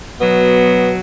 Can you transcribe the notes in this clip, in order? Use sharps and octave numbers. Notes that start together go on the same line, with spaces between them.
B2 F#3 B3